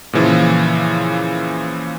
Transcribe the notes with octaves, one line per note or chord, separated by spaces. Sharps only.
A#2 C#3 E3 F3